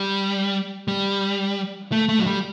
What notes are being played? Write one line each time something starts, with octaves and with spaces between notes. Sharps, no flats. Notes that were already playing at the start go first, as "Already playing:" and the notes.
Already playing: G3
G3
A3
A3
F#3
G3